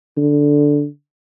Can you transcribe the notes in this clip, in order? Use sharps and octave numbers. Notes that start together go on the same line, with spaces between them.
D3